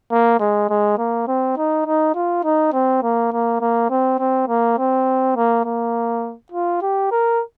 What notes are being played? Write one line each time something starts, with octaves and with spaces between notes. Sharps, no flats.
A#3
G#3
G#3
A#3
C4
D#4
D#4
F4
D#4
C4
A#3
A#3
A#3
C4
C4
A#3
C4
A#3
A#3
F4
G4
A#4